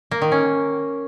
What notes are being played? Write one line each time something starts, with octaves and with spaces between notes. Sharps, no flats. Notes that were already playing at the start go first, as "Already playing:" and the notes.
A#3
D#3
C#4